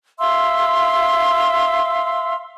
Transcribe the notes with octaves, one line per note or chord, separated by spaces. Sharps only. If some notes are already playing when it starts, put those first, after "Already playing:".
E5 F5 C6 E6